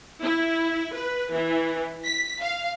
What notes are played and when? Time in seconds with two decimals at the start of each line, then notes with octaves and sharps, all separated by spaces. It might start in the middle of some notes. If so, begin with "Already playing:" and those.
0.21 E4
0.94 B4
1.32 E3
2.05 B6
2.42 F5